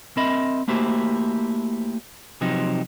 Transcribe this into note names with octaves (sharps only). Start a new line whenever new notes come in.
C4 A#4 D#5 E5 B5
A3 A#3 E4 F#4 G4 C5
C3 F3 F#3 C4 D#4 G4